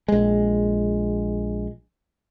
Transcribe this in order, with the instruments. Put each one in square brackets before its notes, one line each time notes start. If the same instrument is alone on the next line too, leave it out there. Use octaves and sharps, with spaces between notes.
[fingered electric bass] A#1 G#3